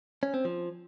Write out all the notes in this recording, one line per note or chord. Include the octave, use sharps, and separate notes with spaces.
C#4
C4
F3